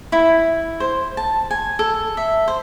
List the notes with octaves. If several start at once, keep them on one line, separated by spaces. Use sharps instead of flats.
E4
C5
A5
G#5
A4
E5
C5